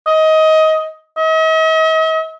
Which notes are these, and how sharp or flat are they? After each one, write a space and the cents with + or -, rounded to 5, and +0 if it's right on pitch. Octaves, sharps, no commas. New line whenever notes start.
D#5 +20
D#5 +45